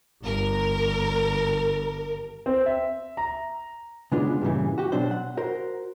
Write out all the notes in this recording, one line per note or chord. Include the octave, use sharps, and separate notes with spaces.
G1 A#4
C4
E5
A#5
C#3 G#3 B3 D4 F4
G2 A#2 C#3 E3
F#4 G4
B2 F#3 D4 C5
F#5
F#4 A#4 C5